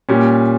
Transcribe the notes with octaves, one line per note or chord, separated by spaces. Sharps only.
A#2 G3 C#4